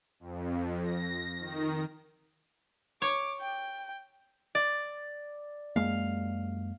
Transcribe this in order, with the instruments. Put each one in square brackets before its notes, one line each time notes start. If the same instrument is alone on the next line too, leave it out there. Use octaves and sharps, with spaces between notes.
[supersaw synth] F2
A#6
D#3
[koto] C#5 [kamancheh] D6
[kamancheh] G5
[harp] D5
[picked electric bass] F#2 G#3 A#3 [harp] F5